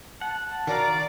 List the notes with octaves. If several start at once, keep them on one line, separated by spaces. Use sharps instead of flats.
F#5 A5
D#3 F#4 A#4 D5 F5 A#5